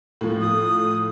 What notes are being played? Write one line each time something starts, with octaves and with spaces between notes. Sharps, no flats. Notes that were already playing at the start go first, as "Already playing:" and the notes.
A2 F3
D#6